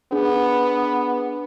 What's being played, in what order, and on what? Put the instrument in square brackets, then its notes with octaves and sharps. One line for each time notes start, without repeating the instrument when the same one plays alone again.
[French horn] B3 [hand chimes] D4 G#4